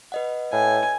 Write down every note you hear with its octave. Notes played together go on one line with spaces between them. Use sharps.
B4 D#5 F#5
A2 G#5